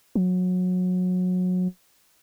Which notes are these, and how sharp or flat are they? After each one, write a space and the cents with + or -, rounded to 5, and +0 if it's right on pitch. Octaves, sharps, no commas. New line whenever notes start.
F#3 -25